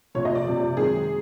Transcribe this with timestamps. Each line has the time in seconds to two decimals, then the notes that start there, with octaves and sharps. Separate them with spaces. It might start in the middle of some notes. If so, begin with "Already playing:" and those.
0.15 F#1 F2 C3 C#5
0.25 D#5
0.35 D5
0.46 F#1 F2 C3
0.77 F#2 D#3 G#3 C4 G#4